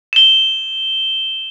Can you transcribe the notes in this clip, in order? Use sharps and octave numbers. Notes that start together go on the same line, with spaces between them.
E7 G7